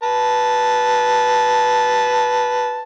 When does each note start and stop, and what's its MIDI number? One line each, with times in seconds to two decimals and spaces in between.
0.03 2.81 71
0.03 2.81 81